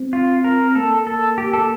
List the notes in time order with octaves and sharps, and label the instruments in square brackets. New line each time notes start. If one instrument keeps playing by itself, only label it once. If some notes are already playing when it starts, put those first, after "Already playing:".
Already playing: [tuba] C4
[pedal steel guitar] F4
A#4
[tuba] A#3 [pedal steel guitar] A4
[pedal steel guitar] A4
G4
A4